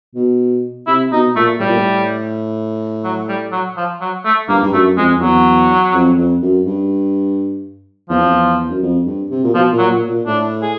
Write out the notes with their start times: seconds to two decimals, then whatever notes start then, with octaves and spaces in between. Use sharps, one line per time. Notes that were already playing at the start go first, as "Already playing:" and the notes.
0.15 B2
0.87 C3 E4
1.11 B2 D#4
1.36 A#2 A3
1.60 A2 G3
1.68 A#2
1.76 A2
3.04 F#3
3.28 G3
3.52 F#3
3.77 F3
4.01 F#3
4.25 A3
4.48 G2 A#3
4.63 G2
4.73 F#2 A3
4.97 F2 G#3
5.16 F2
5.21 E2 F#3
5.93 F2
6.17 F2
6.42 F#2
6.66 G2
8.10 E2 F3
8.19 F2
8.30 E2
8.70 F#2
8.82 F2
9.06 G2
9.30 C3
9.44 A#2
9.54 B2 F3
9.72 A#2
9.78 F#3
9.90 A#2
10.08 A#2
10.26 A2 D4
10.62 G#4